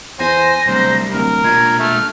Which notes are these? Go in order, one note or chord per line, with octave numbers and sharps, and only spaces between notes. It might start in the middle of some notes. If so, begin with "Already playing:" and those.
E2 C5 G#5 A#6
D1 C2 C5
D1 A#4
A#2 G#3 D4 G#6
A3 F6